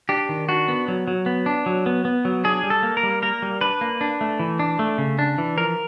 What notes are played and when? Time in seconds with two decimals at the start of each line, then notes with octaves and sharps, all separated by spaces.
0.09 D4 G4
0.29 D#3
0.49 D4 F#4
0.68 B3
0.88 F#3
1.08 F#3
1.26 B3
1.46 D4
1.66 F#3
1.86 B3
2.05 B3
2.25 F#3
2.44 D4 G#4
2.63 G3
2.70 A4
2.83 A#3
2.97 A#4
3.03 G3
3.22 A#3 A#4
3.42 G3
3.61 D4 B4
3.81 A#3
4.01 D4
4.21 A3
4.39 E3
4.59 D4
4.79 A3
4.98 C#3
5.19 D4
5.38 E3
5.57 F3 A#4